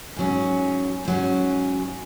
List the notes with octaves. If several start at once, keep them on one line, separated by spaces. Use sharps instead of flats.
G#2 F#3 C#4
G#2 F#3 C#4